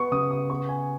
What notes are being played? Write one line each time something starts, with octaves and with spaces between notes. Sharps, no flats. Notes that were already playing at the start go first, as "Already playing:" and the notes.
Already playing: B3 C#6
C#3 D#6
D#6
B3 C#6
G#5